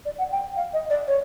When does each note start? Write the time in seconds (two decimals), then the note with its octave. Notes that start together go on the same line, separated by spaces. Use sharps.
0.05 D5
0.18 F#5
0.32 G5
0.57 F5
0.73 D#5
0.90 D5
1.08 C#5